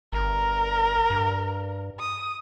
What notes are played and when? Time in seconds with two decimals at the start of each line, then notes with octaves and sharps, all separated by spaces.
0.13 G1 A#4
1.10 G2
2.00 D#6